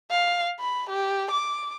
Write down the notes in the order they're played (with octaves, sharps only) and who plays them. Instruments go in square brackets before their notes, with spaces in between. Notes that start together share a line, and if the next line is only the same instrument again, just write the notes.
[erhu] F5
B5
G4
D6